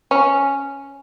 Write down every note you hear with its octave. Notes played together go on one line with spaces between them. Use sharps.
C#4